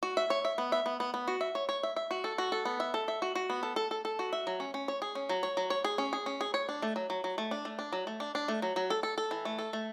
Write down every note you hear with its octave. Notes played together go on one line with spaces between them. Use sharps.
F#4
E5
C#5
E5
B3
E5
B3
B3
B3
F#4
E5
C#5
C#5
E5
E5
F#4
A4
F#4
A4
B3
E5
A4
E5
F#4
F#4
B3
A4
A4
A4
A4
F#4
E5
F#3
C#4
C#4
C#5
G#4
C#4
F#3
C#5
F#3
C#5
G#4
C#4
G#4
C#4
G#4
C#5
D4
A3
F#3
F#3
F#3
A3
D4
A3
D4
F#3
A3
D4
D4
A3
F#3
F#3
A4
A4
A4
E3
A3
A4
A3